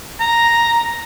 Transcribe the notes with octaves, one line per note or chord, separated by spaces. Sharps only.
A#5